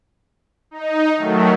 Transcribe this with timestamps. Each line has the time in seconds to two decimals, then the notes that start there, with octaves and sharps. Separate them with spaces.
0.71 D#4
1.17 D#3 F#3 A3